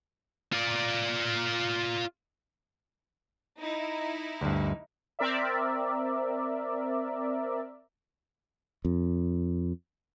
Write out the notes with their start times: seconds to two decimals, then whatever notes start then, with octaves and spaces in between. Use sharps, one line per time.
0.53 F4 D5
3.60 D#4 E4
4.41 D2 G2
5.19 C4 A#4 D5 E5
8.85 F2